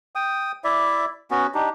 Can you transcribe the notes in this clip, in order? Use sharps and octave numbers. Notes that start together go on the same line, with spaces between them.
G5 D#6
E4 D5 E5
B3 C#4 F#4
D4 D#4 G4